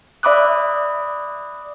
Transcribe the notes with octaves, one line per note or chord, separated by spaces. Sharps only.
D5 E5 B5 D6 D#6 F#6